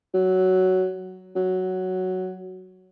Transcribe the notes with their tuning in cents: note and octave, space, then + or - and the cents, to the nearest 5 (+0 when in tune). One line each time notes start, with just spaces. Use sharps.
F#3 +10
F#3 +5